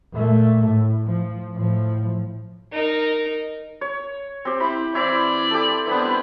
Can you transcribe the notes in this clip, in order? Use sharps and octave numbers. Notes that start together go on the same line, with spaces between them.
A#2 A3
A2
F3
A2 F3
D#4 A#4
C#5
C4 G4
C4 E4 B5
E3 C4 E4 D5
G4 A4
B3 C4 D4 E4 B4